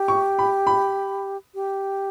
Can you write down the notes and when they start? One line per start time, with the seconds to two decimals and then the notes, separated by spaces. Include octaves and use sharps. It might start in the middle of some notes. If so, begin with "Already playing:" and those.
Already playing: G4
0.08 C#6
0.39 B5
0.67 B5
1.55 G4